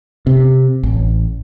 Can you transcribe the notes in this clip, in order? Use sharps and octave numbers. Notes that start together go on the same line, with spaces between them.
C3
A1